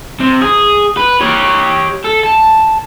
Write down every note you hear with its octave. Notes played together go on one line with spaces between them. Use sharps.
C3
G#4
B4
G4 C#5
A4
A5